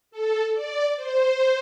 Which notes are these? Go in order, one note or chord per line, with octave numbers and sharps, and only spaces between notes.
A4
D5
C5